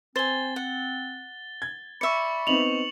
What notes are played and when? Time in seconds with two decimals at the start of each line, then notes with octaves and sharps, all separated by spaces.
0.16 C4 C5 G#5 A6 G7
0.56 F#5
1.62 G#6
2.01 D5 E5 B5 C#6 C#7
2.47 B3 C4 D#4 F7 F#7